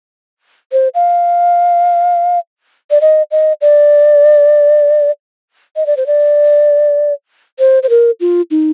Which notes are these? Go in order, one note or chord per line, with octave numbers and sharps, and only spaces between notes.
C5
F5
D5
D#5
D#5
D5
D#5
D5
C5
D5
C5
C5
A#4
F4
D#4